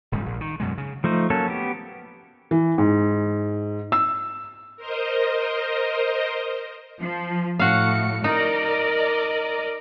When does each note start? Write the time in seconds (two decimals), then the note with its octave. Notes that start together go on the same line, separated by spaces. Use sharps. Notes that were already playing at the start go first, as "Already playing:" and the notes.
0.12 D#1 G#2 C#3 G3
0.26 A#1
0.41 D#3
0.60 F#2 B2 G#3
0.78 C#3
1.04 F3 A3 D#4 C5
1.30 F#3 A#3 C#4 A4
1.48 B3 G4
2.51 E3
2.78 G#2
3.92 E6
4.77 A#4 C5 D#5
7.01 F3
7.59 A2 F#4 F5 C#7
8.24 D#4 A#4 D5 D#5